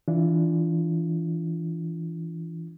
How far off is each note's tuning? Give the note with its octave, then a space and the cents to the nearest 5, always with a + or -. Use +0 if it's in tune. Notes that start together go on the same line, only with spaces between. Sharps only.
E3 +0 D4 +0 F4 -15